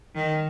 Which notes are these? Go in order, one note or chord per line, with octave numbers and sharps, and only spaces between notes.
D#3